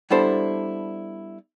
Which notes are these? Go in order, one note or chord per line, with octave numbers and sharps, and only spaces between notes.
G3 B3 D4 E4 A4 C5